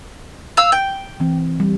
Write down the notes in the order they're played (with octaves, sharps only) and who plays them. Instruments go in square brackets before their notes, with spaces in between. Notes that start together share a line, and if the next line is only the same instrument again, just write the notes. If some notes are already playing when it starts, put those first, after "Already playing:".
[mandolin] F5 E6
G5
[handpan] E3 C4
G3